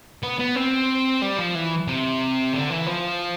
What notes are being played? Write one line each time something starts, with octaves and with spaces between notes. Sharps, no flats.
B3
B3
C4
G3
F3
E3
C3
D3
E3
F3